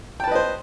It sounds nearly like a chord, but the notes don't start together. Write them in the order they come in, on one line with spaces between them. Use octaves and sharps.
G5 A5 B4 D#5 C5